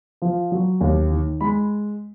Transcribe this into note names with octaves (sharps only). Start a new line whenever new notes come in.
F3
F#3
D#2
D#3
G#3 B5